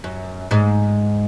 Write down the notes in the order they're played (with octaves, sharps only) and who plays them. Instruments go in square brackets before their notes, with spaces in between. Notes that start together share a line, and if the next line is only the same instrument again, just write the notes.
[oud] F#2
G#2